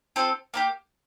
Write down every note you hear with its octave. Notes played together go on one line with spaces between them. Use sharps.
C4 F4 A4
A#3 D#4 G4